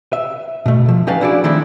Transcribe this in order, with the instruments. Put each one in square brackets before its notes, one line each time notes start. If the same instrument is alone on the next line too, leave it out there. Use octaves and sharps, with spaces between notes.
[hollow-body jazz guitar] E5
B2 A3
F3
C#4 D#4 G4 B4 F5 A5
D4 E4 F#4 G#4 D5
D#3 F3 A3 C4 D4 E4